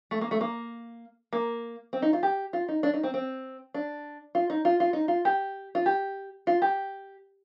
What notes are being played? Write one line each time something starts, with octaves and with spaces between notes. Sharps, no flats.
A3
A#3
A3
A#3
A#3
C4
D#4
F4
G4
F4
D#4
D4
D#4
C4
C4
D4
F4
D#4
F4
F4
D#4
F4
G4
F4
G4
F4
G4